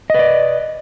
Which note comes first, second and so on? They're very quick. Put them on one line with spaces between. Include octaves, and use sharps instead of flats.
D#5 B4 D5